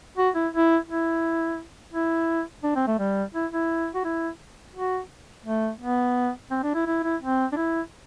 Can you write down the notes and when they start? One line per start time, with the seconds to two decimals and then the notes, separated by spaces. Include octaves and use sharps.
0.17 F#4
0.35 E4
0.53 E4
0.88 E4
1.93 E4
2.64 D4
2.76 C4
2.87 A3
2.99 G3
3.34 E4
3.52 E4
3.95 F#4
4.04 E4
4.75 F#4
5.46 A3
5.81 B3
6.51 C4
6.63 D4
6.75 E4
6.86 E4
7.04 E4
7.21 C4
7.52 D4
7.57 E4